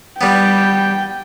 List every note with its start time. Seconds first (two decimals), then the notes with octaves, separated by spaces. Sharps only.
0.21 G3 B3 G5